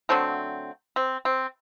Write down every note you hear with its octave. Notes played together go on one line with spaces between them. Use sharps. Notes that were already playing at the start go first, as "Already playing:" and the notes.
D3 F#3 A3 C4
C4
C4